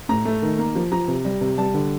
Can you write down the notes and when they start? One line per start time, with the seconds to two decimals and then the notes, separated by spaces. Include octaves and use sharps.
0.09 A2 A#5
0.25 A3
0.42 D#3
0.59 A#3
0.75 F3
0.92 F3 A#5
1.08 C3
1.25 G3
1.41 C3
1.58 G3 A5
1.74 D3